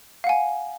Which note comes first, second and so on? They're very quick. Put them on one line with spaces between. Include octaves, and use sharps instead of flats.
F5 F#5 G#5